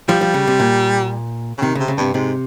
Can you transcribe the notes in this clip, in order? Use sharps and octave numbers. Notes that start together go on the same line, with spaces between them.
F3 G3
F3
C#3
C3
A#2
C#3
C3 D#3
C#3
C3
C#3
G2 C3
G#2 C3